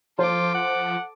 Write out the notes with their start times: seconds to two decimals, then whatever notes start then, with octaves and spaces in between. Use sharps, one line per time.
0.19 F3 F4 A4 C5 D6
0.55 F#5